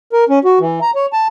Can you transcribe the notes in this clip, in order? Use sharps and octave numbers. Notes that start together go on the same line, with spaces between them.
A#4
C#4
F#4
E3
A#5
C#5
A5